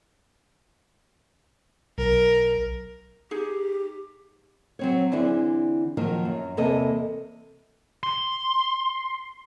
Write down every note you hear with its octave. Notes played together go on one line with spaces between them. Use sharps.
B1 A#4
D#4 G4 G#4
F#3 C4 C#5
D3 E3 C4 D4 E4 G#4
D#3 F3 F#3 A#3
F#2
E2 C3 A#3 A4 D#5
C6